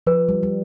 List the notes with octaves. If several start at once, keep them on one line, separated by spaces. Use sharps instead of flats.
F3 B4
G3
G3